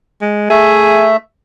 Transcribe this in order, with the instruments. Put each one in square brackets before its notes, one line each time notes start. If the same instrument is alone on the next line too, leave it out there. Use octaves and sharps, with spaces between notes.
[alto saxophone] G#3
[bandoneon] A3 E5 [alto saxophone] G#4